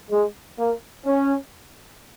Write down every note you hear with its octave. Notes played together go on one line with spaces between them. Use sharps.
G#3
A#3
C#4